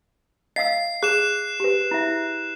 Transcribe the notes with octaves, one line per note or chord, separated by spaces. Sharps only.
D#5 F5 E6 C7
G#4 F#6 E7
G4 B4
E4 E5